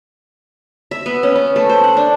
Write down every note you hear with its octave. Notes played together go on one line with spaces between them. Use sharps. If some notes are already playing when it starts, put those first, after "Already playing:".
E5
B3
C#4
B3
A3
C5
F#5
D4